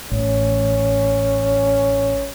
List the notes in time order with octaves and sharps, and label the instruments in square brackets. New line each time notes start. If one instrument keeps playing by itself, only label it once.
[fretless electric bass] A1 [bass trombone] C#4